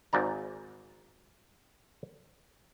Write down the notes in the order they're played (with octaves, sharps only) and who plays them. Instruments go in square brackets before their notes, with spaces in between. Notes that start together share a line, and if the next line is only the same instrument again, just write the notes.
[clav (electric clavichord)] G#1 G#2 D5 A#5